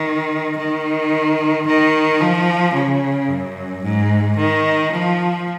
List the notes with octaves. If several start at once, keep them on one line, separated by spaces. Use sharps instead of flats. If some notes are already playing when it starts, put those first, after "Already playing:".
Already playing: D#3
D#3
D#3
F3
C#3
F#2
G#2
D#3
F3